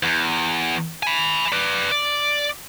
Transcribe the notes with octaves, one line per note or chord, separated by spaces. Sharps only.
E2
G#5 B5
B4 D5
D5